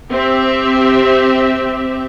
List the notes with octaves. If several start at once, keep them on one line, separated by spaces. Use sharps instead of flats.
C4 G4 E5